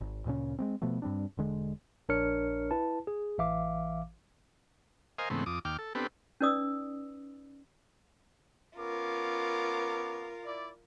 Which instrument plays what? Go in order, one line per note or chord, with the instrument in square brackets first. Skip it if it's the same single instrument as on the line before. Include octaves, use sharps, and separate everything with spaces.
[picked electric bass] G#1
D2 A#2 C#3 C#4
G#3 A3 C4
B2 F3 A3 B3
G2 G3 C4 D4
E1 D3 G#3
[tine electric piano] A#1 D4 A#4 C#5 F6 C#7
E4 B4 A5
G#4
A1 E3 E5 F5 D6
[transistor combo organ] A#4 C5 D#5 F5 G#5
G#2 C#3 E3 A3 B3 C4
F2 D6 D#6
D#2 G5 D6 F6
A4
B3 C4 D4 G4 A4 B4
[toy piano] C#4 D#4 B4 D5 D#6 E6
[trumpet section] B3 C#4 D6 [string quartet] F4 A#4
[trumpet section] E4 D5